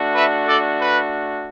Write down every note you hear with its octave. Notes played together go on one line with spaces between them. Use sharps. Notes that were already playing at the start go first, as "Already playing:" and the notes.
Already playing: A3 D4 F#4
B4 E5
A4 D5
B4